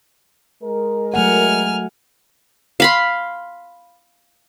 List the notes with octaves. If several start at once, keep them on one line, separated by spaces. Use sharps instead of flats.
G#3 A#4
F#3 A3 F#5 G#5 F6
F5 B5 C6